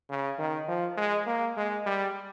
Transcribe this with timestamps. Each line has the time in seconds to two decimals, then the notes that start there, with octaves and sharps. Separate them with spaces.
0.10 C#3
0.39 D#3
0.68 F3
0.97 G#3
1.27 A#3
1.57 G#3
1.86 G3